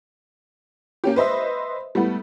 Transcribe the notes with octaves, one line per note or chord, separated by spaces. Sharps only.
A#3 C#4 G4
B4 C5 D#5 E5
G3 A3 B3 E4